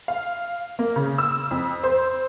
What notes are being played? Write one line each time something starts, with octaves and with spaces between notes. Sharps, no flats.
F5
A#3
C#3
E6
F2
C5